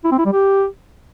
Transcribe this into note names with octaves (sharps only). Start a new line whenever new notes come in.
E4
C4
E4
G3
G4